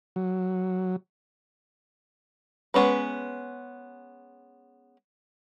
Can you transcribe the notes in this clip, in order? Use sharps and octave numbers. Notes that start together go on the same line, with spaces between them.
F#3
G#3 B3 C#4 B4